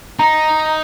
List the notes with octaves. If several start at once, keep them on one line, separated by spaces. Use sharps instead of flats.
D#4 A#5